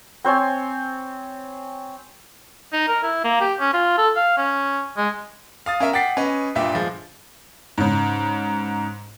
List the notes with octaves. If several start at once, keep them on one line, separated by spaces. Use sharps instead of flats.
C4 C5 C#5 G#5
D#4
A#4
E4
A#3
G4
C#4
F4
A4
F5
C#4
G#3
F5 D#6 A6
C#4 A#4 E5
F#5 G5 D6 A6 B6 C7
C#4 B4 D#5
G2 A#2 E5 G5
F3 G#3
G#2 C#3